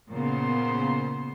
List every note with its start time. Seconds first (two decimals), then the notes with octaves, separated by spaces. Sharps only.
0.10 A#2 C#3 B3 C5